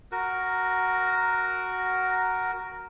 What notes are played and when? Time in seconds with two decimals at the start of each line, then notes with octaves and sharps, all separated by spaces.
0.12 F#4 A#4